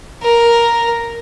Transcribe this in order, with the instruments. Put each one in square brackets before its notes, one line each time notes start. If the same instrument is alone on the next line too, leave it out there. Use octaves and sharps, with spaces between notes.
[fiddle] A#4